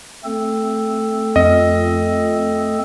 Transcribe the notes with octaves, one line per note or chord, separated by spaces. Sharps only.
A3 C4 A4
F2 D#5